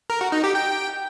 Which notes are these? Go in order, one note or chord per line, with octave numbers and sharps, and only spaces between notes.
A#4
F#4
D#4
G4
G5